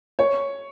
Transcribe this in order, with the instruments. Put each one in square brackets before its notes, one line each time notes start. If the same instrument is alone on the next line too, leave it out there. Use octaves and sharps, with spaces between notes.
[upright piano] C#5